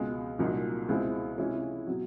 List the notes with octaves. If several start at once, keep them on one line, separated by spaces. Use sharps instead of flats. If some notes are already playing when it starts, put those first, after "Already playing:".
Already playing: C#2 B2 G#3
C2 A#2 F#3 A#3 D#4
C#2 B2 G#3 C4 E4
C3 E3 G#3 C#4 E4
B2 F#3